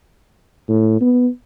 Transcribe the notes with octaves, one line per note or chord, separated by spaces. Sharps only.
A2
B3